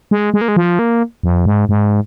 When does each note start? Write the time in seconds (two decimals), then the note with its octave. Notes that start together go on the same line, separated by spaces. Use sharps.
0.11 G#3
0.34 G#3
0.41 A#3
0.48 G#3
0.56 F3
0.79 A#3
1.23 F2
1.46 G#2
1.69 G#2